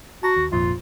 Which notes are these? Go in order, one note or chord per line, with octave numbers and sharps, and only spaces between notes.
F#4 A5 A#5
D#2
G#1 F2 A#2 F4